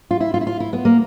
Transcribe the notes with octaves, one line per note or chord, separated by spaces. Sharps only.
F4
E4
F4
E4
F4
E4
B3
A#3